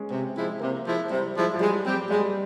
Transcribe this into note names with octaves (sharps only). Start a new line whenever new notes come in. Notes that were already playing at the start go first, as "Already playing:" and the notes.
Already playing: G#3 C#4
C3 C4
F3 G#3 E4
C3 A#3
F3 G#3 E4
C3 G3
F3 G#3 E4
F3
G3 G#3
G3 C4 G4
G3 G#3